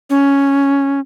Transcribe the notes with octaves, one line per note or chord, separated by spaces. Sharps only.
C#4